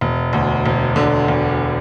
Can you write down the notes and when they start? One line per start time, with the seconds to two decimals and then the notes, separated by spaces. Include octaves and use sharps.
0.01 E1
0.33 D2
0.66 E1
0.96 D3
1.28 E1